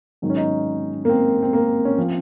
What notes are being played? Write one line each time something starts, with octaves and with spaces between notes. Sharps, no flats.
G#2 D#3 F#3 D#4
C#4
D#4
A#3
C4
C4
A#3
C#4
F3 C4